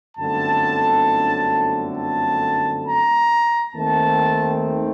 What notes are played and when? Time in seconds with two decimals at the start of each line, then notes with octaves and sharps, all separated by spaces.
0.18 G1 F#2 D3 A3 C4 A5
1.97 A5
2.86 A#5
3.75 D#2 D#3 A3 C4 A5